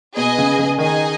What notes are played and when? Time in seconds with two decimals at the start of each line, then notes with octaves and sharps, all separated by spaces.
0.16 B2 G#4 B4 D#5 G#5
0.38 C#3
0.59 C#3
0.78 D#3 D#4 G#4 D#5 G#5